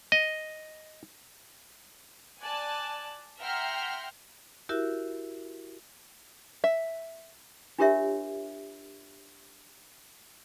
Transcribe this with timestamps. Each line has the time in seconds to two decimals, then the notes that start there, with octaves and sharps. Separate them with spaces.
0.12 D#5
2.41 D5 G#5 A5 F#6
3.41 E5 F#5 G5 A#5 C6 F6
4.69 E4 F#4 G4 A#4 E5
6.64 E5
7.79 D4 F4 G4 A#4 C#5 E5